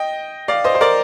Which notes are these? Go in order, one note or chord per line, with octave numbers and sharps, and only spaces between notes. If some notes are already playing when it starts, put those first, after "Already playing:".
Already playing: D#5 G5
D5 F5
C5 D#5
C5
A#4 D5